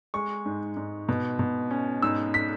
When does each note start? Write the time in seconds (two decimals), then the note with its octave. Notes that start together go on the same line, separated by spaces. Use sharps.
0.14 G#3 C#6
0.46 G#2
0.77 G#2
1.09 B2
1.39 B2
1.71 C#4
2.02 G#2 E6
2.34 B6